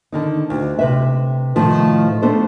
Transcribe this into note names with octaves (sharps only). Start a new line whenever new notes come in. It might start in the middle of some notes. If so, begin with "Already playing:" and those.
D3 D#3 D#4
D2
C3 B4 E5
A2 C3 D#3 F3 A3
A3 B3 D4 A4 C5